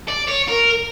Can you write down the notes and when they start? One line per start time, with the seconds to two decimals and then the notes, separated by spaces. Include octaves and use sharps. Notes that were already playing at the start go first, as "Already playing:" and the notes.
0.08 D5
0.28 C#5
0.48 A#4